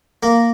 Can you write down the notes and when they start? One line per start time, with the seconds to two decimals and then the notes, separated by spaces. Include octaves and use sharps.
0.23 A#3